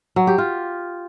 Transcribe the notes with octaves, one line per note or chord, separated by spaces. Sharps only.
F#3
G4
F4